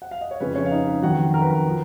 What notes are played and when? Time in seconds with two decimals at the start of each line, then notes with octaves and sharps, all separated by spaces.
0.02 F#5
0.11 F5
0.21 D#5
0.31 C#5
0.40 F2 C#3 F3 G#3 C#4 B4
0.55 C#4 C#5
0.66 F5
0.71 D#4 D#5
0.87 B4
1.02 F2 D#3 F#3 F#4 F#5
1.34 A#4
1.41 B4
1.50 A#4
1.68 F3